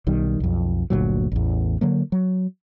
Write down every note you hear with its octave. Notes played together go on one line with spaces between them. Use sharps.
B1 D#3 G3
B1 F2
G1 D2 A#2 F#3
A1 E2
D3 F#3 A#3
F#3